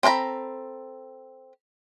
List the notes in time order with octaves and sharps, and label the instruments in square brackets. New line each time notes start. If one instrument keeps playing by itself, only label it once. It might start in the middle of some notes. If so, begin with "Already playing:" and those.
[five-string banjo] C4 A4 F5 A#5 B5